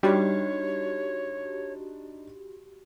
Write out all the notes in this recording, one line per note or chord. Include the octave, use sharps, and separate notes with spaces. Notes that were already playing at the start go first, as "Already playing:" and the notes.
G3 D4 D#4 F#4 G4 C#5